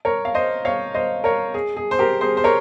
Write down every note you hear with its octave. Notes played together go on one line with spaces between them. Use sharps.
A#4 C#5
F5
C5 D#5
C#5 F5
C5 D#5
A#4 C#5
G#4
G#4
C5
G4 A#4
G#4 C5
C5
A#4 C#5